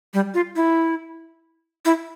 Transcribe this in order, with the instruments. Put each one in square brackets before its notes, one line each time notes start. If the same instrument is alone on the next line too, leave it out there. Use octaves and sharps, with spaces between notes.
[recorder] G3
F4
E4
E4